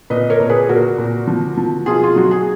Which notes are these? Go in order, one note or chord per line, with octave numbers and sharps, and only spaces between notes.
A#2 B4 D#5
A#4 C#5
A#2
G#4 B4
A#2 F#4 A#4
A#2
F3
F3
B2 F4 G#4
F4
F#3 F#4
G#4